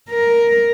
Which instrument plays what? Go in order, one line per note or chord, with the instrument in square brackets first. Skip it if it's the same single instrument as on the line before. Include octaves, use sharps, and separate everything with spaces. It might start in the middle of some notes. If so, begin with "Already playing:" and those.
[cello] A#4